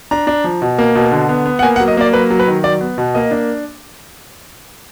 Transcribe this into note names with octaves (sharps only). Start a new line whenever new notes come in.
D4 A#5
D4
F3
B2
A#3
B2
D3
B3
B3
F#5
A#3 G#5
F#5
F#3
D#5
A#3 D5
F#3 B4
F#3
B4
D#3
F#3 D5
B3
B2
A#3 D#5
D4